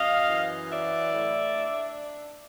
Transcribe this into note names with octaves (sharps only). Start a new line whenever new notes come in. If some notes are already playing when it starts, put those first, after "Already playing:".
Already playing: F#2 D#5 F5
E3
F#3 D5 E5
A2
D4